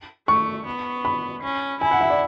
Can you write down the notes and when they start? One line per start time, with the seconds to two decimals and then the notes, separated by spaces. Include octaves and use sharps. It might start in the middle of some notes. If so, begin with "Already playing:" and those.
0.28 A3 C#6
0.66 B3
1.05 B5
1.43 C#4
1.81 E4 G#5
1.91 F#5
2.01 E5
2.10 D5